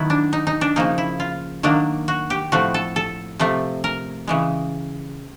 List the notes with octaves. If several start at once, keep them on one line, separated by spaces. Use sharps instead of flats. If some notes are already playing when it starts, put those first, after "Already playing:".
Already playing: D#3 F#3 B3 E4
D4
D#4
D#4
D4
C#3 F3 A#3 D#4
E4
F4
D#3 F#3 A#3 D4
F#4
G4
A2 F3 A3 C4 F#4
A4
A4
C3 F3 A3 C4
A#4
C#3 E3 G#3